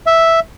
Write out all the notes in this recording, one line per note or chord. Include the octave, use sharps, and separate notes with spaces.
E5